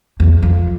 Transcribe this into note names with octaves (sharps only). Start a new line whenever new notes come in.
E2
F2